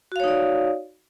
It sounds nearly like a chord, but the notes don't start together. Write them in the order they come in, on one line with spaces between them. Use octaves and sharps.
F#4 F5 C#5 D#4 D5